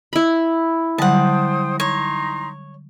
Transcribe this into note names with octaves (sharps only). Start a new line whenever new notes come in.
E4 B5
D3 F#3 G3 C5 F#5 G5 A5 D#6
D#4 C#5 A#5 C6